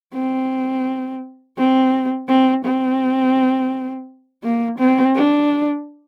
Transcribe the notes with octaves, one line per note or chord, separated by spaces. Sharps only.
C4
C4
C4
C4
A#3
C4
D4